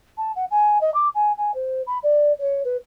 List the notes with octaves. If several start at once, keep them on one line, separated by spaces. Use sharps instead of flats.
A5
F#5
G#5
D#5
D6
G#5
G#5
C5
B5
D5
C#5
B4